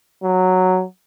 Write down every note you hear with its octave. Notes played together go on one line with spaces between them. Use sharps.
F#3